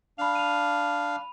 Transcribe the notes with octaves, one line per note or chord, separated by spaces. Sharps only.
D4 F5 B5 F7
D#7 F7